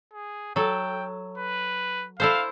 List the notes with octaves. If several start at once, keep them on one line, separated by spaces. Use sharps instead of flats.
G#4
F#3 A4 G5
B4
E4 A4 C5 F5